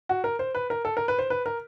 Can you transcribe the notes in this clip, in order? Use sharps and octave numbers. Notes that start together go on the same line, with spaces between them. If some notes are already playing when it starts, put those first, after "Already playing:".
F#4
A#4
C5
B4
A#4
A4
A#4
B4
C5
B4
A#4